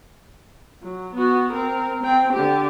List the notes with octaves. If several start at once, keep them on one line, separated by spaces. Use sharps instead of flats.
F#3
B3 F#4
C4 A#4
C4 G5
D3 G4